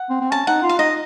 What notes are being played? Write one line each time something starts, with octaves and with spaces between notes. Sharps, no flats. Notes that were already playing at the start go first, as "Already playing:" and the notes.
Already playing: F#5
C4
C4
C#4 A5
D#4 F#5
F4
F5
D#4 D#5